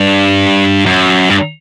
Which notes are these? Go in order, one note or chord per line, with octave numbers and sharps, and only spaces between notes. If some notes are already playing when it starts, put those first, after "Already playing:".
Already playing: G2
F#2
G2